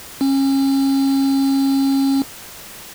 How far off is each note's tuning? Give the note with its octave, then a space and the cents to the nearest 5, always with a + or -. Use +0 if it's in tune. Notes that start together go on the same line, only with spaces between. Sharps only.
C#4 -30